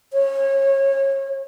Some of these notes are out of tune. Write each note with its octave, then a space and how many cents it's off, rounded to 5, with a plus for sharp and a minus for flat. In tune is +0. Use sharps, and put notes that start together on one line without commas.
C#5 -30